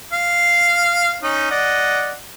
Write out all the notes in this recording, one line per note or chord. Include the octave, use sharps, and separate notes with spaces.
F5
C#4 D#4
D5 D#5 F#5